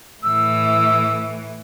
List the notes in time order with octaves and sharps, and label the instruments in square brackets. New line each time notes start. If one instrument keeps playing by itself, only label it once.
[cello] A2 E3 [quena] E6